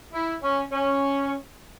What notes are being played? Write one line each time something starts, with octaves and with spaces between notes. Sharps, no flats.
E4
C#4
C#4